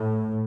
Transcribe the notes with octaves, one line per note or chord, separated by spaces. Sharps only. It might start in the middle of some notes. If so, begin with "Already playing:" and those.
Already playing: A2